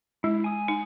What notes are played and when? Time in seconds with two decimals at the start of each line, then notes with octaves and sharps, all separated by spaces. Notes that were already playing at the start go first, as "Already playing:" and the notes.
0.24 G#3 E4
0.44 G#5 D#6
0.68 D#4